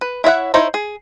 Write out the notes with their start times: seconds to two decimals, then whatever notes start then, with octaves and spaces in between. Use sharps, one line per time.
0.01 B4
0.24 E4 C#5 E5 F#5
0.54 D#4 E4 C5 C#5
0.74 G#4